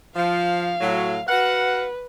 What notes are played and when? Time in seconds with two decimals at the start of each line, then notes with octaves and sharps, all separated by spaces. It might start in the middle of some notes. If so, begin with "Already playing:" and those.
0.16 F3 F5
0.80 A2 F#3
1.28 F#4 B4 F5 F#5